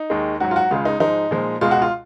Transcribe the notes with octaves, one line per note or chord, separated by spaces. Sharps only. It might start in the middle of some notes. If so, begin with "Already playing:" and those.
Already playing: D#4
D#2 D#3 G#3
G#2 F#3 F#4
F4
F#4
C#2 C#3 G#3 F4
D#4
G#2 F3 G#3 D#4
A#2 F3 G#3
C#2 B2 G#3 F4
F#4
F4